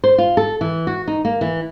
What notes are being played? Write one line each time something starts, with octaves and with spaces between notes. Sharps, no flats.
C5
F4
A4
E3
F#4
D#4
A#3
E3